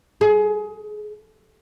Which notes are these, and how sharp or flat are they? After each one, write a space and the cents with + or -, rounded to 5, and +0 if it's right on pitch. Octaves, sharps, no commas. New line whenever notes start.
G#4 +25